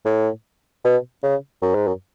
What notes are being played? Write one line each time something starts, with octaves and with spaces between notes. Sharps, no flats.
A2
B2
C#3
F#2
G#2
F#2